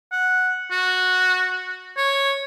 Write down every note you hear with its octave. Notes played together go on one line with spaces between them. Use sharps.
F#5
F#4
C#5